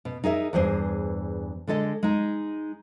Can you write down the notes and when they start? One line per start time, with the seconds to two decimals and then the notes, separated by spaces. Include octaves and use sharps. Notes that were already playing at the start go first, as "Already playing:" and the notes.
0.05 B2
0.24 D#4 G#4 A#4 E5
0.53 E2 G2 G#4 C5
1.67 D3 G#3 A4 D#5
2.03 G#3 D#4